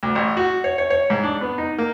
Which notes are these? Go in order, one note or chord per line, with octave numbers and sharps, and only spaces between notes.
D2
A1
F#4
C#5
C#5
C#5
G#2
D4
B3
D#4
A#3